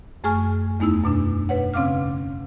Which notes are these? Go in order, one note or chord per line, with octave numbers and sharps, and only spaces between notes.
F#2 A3 G#4 G#5 C#6 F6
E2 A3 B3 D#4 E4 E6
F#2 B2 D4
B4 C#5 F#5
C#3 C4 C#4 F5 D6 F6